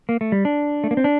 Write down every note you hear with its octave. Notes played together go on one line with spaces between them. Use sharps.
A#3
A3
G3
D4
A3
A#3
C4
D4